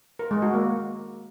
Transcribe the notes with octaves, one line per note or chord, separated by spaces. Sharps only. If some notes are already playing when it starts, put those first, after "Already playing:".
A#4
G#3
F#4
A#3